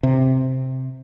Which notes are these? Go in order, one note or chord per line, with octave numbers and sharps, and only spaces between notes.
C3